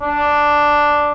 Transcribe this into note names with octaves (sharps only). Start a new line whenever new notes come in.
D4